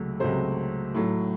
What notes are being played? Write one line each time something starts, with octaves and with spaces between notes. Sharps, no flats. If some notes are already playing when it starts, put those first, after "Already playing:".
Already playing: C#2 C3 F#3 A3
C#2 C3 F#3 A3 C5
A2 F#3 A3